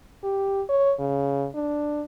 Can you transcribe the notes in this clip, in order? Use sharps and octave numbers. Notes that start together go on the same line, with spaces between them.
G4
C#5
C#3
D4